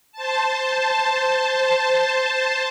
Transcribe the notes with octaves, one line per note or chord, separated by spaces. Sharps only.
C5 A5